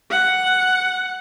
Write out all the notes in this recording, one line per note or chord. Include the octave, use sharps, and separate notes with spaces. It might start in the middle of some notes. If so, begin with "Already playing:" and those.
F#5